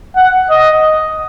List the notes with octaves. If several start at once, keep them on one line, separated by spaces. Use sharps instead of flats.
F#5
D#5